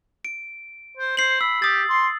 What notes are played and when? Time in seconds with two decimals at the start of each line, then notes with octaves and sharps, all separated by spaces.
0.25 D7
0.97 C5
1.17 C5 C7 F#7
1.41 B5 E6
1.62 G4 D#6 A6
1.90 C6